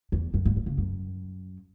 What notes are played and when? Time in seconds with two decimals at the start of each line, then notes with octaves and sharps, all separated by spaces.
0.12 E2
0.34 F#2
0.45 G2
0.56 A2
0.66 C#3
0.78 F#2